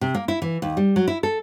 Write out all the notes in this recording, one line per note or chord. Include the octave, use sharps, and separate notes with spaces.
C3
A#3
E4
E3
D#2
G3
F#3
E4
A4